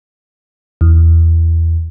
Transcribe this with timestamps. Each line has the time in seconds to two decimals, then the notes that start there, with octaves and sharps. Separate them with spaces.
0.81 E2